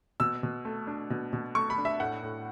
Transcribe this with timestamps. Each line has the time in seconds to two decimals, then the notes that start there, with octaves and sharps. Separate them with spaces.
0.20 B2 E6
0.43 B2
0.65 A3
0.87 D4
1.10 B2
1.33 B2
1.55 A3 C#6
1.70 B5
1.78 D4
1.85 E5
2.00 A2 F#5
2.23 A2